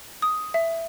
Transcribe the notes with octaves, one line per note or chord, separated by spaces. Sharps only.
D#6
E5